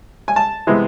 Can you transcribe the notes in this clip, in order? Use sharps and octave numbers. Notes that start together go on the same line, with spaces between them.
G#5
A5
C3 E3 G#3 B3